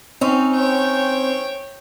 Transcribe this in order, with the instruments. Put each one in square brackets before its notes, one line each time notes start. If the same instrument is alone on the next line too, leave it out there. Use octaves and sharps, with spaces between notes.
[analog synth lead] C4 [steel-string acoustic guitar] C#4 D#4
[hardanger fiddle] C#5 G5